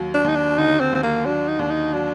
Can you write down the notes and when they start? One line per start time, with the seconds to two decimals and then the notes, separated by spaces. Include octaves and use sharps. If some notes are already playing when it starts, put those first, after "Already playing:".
Already playing: D#2 F#3
0.14 D4
0.24 D#2 D#4
0.35 D4
0.58 D3 D#4
0.80 C4
0.92 D#2 C4
1.03 A#3
1.26 F#3 D4
1.48 D#4
1.59 D#2 D4
1.70 D#4
1.93 F#3 D4